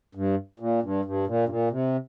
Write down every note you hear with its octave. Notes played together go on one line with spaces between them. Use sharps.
G2
A#2
G2
G2
A#2
G2
A#2
C3